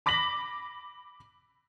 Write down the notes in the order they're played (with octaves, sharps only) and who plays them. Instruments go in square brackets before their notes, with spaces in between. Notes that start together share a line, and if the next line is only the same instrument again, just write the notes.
[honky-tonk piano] B5 D6 A#6 B6 F#7